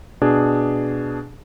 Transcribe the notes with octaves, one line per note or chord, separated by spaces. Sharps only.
B2 D4 G#4